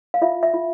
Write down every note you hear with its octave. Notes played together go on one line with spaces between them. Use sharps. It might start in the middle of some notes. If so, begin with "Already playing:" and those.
F5
F4 E5
E5
F4